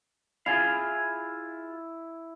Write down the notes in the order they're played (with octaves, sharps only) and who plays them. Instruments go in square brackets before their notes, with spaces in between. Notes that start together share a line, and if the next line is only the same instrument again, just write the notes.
[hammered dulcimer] E4 [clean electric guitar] F4 G#4 F5